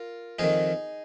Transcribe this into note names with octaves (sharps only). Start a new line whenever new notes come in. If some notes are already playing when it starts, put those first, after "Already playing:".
Already playing: F4 A#4
F2 D#3 D#4 G#4